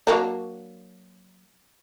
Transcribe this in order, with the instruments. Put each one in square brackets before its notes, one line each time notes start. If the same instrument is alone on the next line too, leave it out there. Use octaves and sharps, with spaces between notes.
[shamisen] F#3 A#3 D4